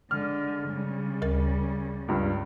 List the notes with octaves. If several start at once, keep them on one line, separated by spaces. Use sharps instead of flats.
D3 G#3 F6
C#3 G3
D2 A#4 A6
C#2 G2